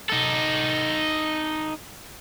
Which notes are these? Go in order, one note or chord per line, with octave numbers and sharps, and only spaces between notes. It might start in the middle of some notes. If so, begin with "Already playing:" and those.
D#4 A4